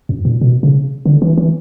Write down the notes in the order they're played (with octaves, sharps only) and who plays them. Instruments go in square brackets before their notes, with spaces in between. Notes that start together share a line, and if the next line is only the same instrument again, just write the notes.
[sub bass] F#2
A#2
B2
C#3
D3
E3
E3